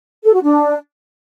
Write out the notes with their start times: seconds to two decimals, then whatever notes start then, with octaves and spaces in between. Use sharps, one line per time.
0.24 A4
0.33 F#4
0.42 D4